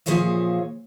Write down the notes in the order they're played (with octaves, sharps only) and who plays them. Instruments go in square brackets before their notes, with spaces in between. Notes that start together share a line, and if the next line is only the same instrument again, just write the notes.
[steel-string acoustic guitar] A#2 F3 G#4 C5 C#5 E5